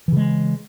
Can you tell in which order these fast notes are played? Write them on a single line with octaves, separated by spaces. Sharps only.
E3 C#3 G#3